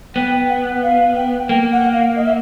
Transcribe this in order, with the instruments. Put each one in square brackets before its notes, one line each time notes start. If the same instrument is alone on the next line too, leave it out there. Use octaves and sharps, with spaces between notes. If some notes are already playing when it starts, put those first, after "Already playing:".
[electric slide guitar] B3 [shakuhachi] G5
[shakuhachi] F#5
F5
G5
[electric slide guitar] A#3 [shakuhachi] G5
[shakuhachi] F#5
F5
D#5
E5